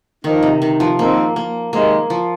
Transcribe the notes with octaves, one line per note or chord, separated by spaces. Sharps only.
D#3 F3 A#3 D#4
C3
D#3
F3
G#2 D#3 A#3 C4
A#3
C3 D#3 G#3 A#3
F3